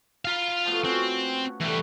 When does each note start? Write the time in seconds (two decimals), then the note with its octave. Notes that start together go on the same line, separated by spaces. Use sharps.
0.25 F4 F5 A#5 B5
0.65 F3 A3 B3
0.85 C4 C#4 F#4 C#6
1.61 E3 G3 A3 B4